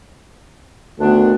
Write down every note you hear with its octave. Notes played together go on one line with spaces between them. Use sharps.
D2 D#3 B3 D4